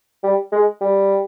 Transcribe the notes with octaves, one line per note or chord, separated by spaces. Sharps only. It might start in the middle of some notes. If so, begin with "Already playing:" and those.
G3
G#3
G3